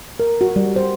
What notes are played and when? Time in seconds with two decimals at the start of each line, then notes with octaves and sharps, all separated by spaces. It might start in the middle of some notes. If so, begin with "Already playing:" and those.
0.20 A#4
0.41 F#4
0.56 G3
0.76 C5